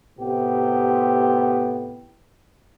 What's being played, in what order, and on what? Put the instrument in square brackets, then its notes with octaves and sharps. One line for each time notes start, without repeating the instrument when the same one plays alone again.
[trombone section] A2 C3 B3 G4